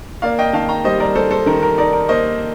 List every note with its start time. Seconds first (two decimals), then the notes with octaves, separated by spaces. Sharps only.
0.22 A#3 D5 F5
0.39 D#5 G5
0.53 D#3 F5 A5
0.69 G5 A#5
0.84 G3 C5 D#5
1.00 A#4 D5
1.15 G3 A4 C5
1.31 A4 C5
1.46 D#3 A#4
1.63 A#4
1.78 D#4 A#4 D5
1.93 A#4
2.09 A#3 C5 D#5